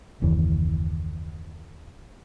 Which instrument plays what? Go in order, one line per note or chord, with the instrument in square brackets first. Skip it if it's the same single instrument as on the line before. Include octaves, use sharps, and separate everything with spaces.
[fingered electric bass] F#1 D#2 E3